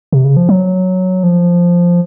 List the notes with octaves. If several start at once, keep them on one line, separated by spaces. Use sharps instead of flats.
C3
C#3
F3
F#3
F3